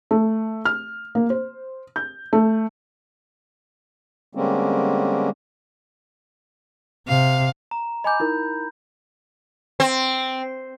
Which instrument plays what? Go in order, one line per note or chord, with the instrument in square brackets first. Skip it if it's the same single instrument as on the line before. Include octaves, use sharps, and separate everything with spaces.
[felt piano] A3
F6
A#3
C5
G6
A3
[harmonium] D3 G3 G#3 A#3 C4 C#4
[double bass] C3 [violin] F5
[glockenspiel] A#5
[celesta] D#5 G#5 D6 [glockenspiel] B5 G6
[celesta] D#4 E4 A#4
[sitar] C4